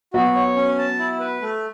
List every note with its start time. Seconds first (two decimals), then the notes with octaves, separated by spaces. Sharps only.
0.14 F#3 B3 F#4
0.35 C#5
0.56 C#4
0.78 A5
0.99 E4
1.20 B4
1.42 A3